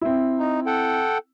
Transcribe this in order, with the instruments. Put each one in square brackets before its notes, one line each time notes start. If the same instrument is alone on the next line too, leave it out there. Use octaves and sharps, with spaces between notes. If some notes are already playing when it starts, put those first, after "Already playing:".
[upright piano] C4 E4
[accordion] D#4
A4 F#5 G5